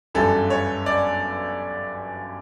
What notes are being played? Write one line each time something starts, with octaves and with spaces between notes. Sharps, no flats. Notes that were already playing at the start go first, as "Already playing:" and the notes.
G1 F#2 E3 G3 A4
C#5
D5